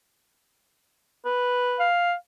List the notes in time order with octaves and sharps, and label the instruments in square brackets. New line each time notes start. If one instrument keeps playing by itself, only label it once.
[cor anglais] B4
[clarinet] F5